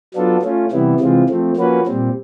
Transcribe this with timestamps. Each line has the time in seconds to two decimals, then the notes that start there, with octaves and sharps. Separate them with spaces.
0.14 F#3 B3 D4 F4 A4
0.43 A3 C#4 F4
0.72 C3 E3 G3 B3 E4
1.00 C3 E3 G#3 C4 F4
1.29 F3 A3 C4
1.57 F3 A#3 C#4 F#4 B4
1.86 A#2 G3 C4